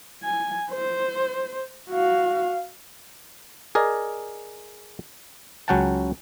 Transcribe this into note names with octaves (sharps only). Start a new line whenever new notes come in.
G#5
C5
F#4 F5
G#4 A#4 D5 D#5
C#2 F#3 C#4 F#5 G5 A5